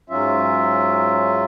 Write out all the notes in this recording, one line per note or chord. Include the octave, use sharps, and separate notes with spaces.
G#2 F#3 C#4 F4 E5